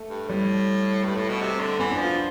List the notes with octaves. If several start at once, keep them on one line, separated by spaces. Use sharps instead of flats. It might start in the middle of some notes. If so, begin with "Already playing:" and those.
Already playing: A3
G2
A2 G3
G2 A3
A2
B2
C3
D3
E3 B3
D4
F3
F4